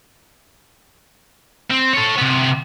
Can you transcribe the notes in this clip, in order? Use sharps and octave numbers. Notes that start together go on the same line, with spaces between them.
C4
A4 C#5
C3 B3